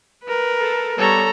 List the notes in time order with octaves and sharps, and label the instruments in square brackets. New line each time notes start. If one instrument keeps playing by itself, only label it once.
[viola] A#4 B4
[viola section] A4
[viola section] G3 B3 C#5 [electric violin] A4 A#5